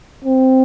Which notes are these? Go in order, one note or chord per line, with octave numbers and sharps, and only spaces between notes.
C4